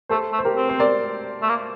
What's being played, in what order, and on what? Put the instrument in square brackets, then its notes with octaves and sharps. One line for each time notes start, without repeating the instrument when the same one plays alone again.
[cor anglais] A3 [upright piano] A4 C5
[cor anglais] A3
[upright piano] C5
G4 A#4
[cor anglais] C4
[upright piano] C5
A#4 D5
[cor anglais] A3
A#3